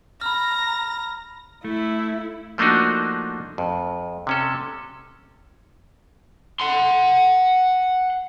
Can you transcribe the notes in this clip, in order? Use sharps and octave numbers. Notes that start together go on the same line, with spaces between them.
A#5 B5 F6 A#6
A3 E4
F3 A3 A#3 D4 D#4 F#4
F2
C3 C#4 A4
F#5 C6